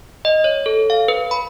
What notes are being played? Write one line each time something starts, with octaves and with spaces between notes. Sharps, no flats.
D#5
C#5
A4
F5
B4
B5